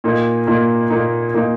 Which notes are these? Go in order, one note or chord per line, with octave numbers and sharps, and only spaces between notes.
A#2 A#3 D#4
A#2 A#3 D#4
A#2 A#3 D#4
A#2 A#3 D#4